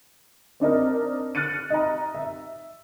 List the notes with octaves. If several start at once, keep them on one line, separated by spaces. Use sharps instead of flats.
C4 D4 D#4 A#4
F6 F#6 A6 C#7 D#7
D#4 A#5
E5